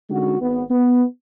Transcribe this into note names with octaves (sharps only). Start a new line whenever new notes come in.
D3 G#3 C#4 D#4 F#4
G#1 B3
B3